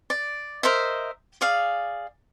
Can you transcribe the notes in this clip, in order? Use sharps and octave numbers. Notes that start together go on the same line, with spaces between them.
D5
A#4 C5 D#5 E5
G#4 D5 F5